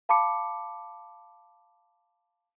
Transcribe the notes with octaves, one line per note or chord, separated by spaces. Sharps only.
F5 A5 B5 D6 C#7